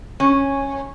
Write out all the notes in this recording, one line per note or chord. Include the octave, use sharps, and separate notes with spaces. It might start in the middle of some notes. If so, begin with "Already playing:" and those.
C#4